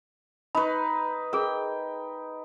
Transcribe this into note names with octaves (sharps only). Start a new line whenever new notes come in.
D#4 B4 B5 C#6
G#4 A#4 G5